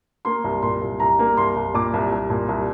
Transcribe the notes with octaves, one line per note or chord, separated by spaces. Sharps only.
A#3 C6
C2
A#2 C6
C2
C2 A#5
A#3
C2 C6
C2
A#2 D6
C2
C2
A#2
C2